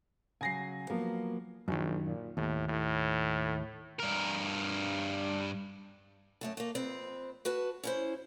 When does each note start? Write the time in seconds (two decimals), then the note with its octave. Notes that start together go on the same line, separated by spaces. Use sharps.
0.41 C#3 F#3 G#5 A#6 C7
0.90 F3 F#3 A#3 B3
1.68 A#1 F#2 D#3
2.05 A#2
2.37 D#2 A2
2.68 A2
3.99 G2 A#4
6.41 F#2 A3 A5
6.57 A3 A#3
6.75 F2 C4 B4
7.45 F#4 B4 A5
7.83 C#4 E4 C5